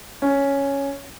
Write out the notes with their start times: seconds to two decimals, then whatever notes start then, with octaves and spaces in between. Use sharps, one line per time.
0.22 C#4